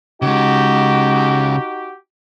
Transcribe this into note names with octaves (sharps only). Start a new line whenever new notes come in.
C#3 G#3 D#4 F#4 G4